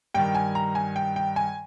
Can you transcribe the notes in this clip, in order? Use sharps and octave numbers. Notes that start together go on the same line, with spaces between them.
G2 D#3 G5
G#5
A#5
G#5
G5
G5
G#5